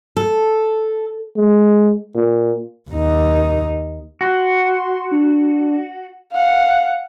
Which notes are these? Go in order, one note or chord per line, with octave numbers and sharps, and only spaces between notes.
A4
G#3
A#2
D#2 D#4
F#4 C6
D4
F5 F#5